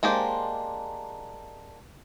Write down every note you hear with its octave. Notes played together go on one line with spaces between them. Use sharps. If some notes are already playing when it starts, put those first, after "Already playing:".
G#3 A#3 D4 G4 C5